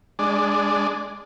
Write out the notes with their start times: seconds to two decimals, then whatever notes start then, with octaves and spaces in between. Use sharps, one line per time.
0.19 G#3 D4